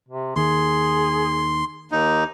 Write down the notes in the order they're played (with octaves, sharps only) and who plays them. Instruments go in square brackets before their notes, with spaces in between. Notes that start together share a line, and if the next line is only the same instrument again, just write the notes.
[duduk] C3
[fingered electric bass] D#2 D#3 [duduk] G#4 [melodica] C6
[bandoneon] D#2 D#4